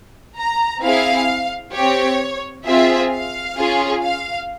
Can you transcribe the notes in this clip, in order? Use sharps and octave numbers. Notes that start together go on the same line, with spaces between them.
A#5
C4 E4 G#4 F5
C4 G4 C#5
C4 F4 G#4 E5
F5
C#4 F4 G#4
F5